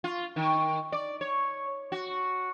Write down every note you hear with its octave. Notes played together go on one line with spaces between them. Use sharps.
F4
D#3
D5
C#5
F#4